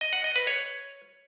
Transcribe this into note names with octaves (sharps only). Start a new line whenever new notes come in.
D#5
F#5
D#5
B4
C#5